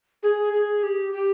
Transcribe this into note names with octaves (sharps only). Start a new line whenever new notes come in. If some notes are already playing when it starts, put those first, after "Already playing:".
G#4
G#4
G4
G4